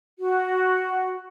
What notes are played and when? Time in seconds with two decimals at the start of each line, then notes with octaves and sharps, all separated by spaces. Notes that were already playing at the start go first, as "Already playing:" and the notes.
0.19 F#4